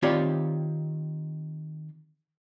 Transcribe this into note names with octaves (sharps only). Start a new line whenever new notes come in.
D#3 C4 F4 G4 C#5 D5